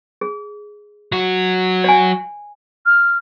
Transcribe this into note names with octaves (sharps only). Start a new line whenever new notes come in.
G#4
F#3 F#4
D5 G#5
F6